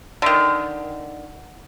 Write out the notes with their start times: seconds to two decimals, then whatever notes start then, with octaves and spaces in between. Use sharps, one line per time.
0.22 D3 D#3